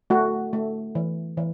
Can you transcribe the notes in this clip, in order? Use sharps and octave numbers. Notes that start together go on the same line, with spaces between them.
A3 F#4
A3
E3
E3